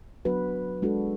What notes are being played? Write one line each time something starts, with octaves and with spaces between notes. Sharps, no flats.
F#3 B3 D4 F#4 B4
G#3 D4 F#4 A4